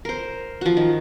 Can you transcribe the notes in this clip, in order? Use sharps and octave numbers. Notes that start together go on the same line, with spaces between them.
A#4 C5
F3 F#4
D#3